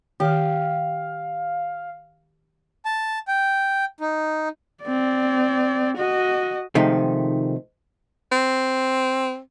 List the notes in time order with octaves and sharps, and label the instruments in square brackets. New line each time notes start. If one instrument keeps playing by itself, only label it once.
[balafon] D#3 [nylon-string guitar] G4 [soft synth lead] F5
[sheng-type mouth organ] A5
G5
D#4
[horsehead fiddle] C4 D5
F#4 D#5
[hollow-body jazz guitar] C3 D#3 F3 G#3 A3 D#4
[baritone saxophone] C4